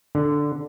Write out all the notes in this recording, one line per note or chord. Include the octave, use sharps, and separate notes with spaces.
D3